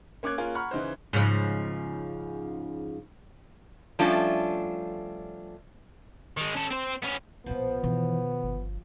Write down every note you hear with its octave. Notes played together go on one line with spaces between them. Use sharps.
A#3 C#4 D6 F#6 G#6
A#3 C#4 F4 G#4 A#4
F#5 A#5 B5 C#6 F6
C#3 E3 D#4 C5
G#2 C#3 F3
F3 G3 A3 C#4 D4 F4
D#3 G#3
C#4 A4
C4 C5
B3 C#4
B1 A#2 F3 B3
B2 D#3 E3
G1